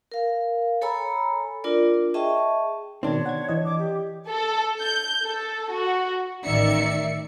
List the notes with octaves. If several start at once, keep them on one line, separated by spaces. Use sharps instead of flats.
A#4 F5
A4 C#5 G#5 A#5 B5 E6
D4 F4 A#4 D5
G#4 D#5 E5 G5 A5 C#6
B2 D#3 C4 D4 C#5
F#5 G#6
E3 D#5
D6
G4
A4
G6
A4
F#4
A1 D#3 D5 E5 C#7